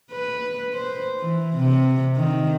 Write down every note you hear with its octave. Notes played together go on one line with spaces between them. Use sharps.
B4
C5
E3
C3
D#3